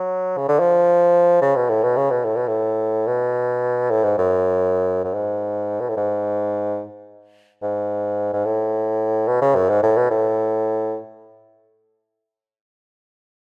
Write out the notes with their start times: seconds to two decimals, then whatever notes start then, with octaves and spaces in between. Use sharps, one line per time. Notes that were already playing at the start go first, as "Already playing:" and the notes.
Already playing: F#3
0.37 C#3
0.48 D3
0.59 F3
1.42 C#3
1.56 B2
1.70 A2
1.83 B2
1.96 C#3
2.11 B2
2.24 A2
2.36 B2
2.48 A2
3.07 B2
3.90 A2
4.03 G#2
4.18 F#2
5.04 F#2
5.14 G#2
5.80 B2
5.89 A2
5.97 G#2
7.62 G#2
8.33 G#2
8.45 A2
9.27 B2
9.42 C#3
9.55 F#2
9.69 G#2
9.83 A2
9.97 B2
10.11 A2